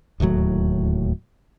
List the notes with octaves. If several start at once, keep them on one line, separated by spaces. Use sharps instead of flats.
D1 D#2 A2 F#3